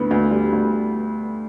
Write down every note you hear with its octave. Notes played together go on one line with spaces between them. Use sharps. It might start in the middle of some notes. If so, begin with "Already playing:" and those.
Already playing: D2 D3 B3
D2
G3
D2